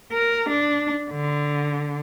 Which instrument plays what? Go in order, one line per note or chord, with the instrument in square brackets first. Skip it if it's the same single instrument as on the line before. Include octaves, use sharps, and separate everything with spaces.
[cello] A#4
D4
D3